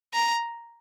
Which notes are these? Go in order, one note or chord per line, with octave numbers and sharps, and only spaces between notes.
A#5